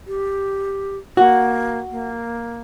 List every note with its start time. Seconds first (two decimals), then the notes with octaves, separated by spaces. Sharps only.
0.07 G4
1.17 A#3 F#4
1.91 A#3